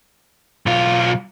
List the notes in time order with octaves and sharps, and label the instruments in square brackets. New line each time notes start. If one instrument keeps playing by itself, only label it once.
[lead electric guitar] B1 F4